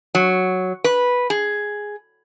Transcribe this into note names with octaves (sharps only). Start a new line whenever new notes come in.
F#3
B4
G#4